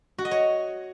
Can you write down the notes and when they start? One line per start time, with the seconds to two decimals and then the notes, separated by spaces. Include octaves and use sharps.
0.18 F#4
0.25 D#5
0.31 C#5